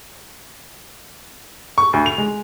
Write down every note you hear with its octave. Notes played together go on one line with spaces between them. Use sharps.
C#6
D2
F7
G#3